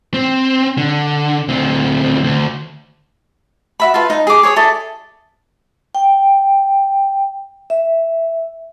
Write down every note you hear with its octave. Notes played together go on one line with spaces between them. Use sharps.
C4
D3
D2 C4
D2
F#4 E5 B5
F4 A4 B4
D#4
G#4 D6
G#4 C#5 C#6 D#6
E4 G#4 A4 D5
G5
E5